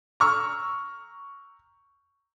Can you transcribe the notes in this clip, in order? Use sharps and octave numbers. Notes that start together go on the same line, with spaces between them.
A#5 C#6 E6 F6